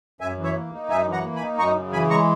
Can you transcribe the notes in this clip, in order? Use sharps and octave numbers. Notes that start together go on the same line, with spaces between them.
F#2 E5 G#5
E3
C#5 E5
A#3
D#4
F#2 E5 G#5
E3
F#5 A#5
A#3
G#5 B5
D#4
F#2 A#5 C#6
C#3
E3 G#5 B5
G#3 A#5 C#6